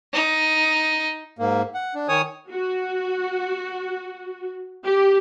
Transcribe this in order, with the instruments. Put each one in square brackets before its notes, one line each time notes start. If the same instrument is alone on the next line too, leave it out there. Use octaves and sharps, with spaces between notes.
[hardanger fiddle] D#4
[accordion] G#2 A#3
F#5
D4
D#3 C#5 G#5 D#6
[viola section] F#4
G4